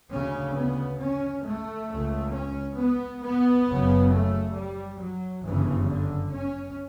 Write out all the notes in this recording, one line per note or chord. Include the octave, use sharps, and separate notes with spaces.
D2 C#3 C#4
B3
C#4
A3
C#2 C#3
C#4
B3
B3
F#1 F#2 C#3
A3
G3
F#3
G1 F#2 C#3 E3
D3
C#4